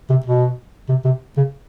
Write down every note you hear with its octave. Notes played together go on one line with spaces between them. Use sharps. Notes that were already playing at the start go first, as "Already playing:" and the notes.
C3
B2
C3
C3
C#3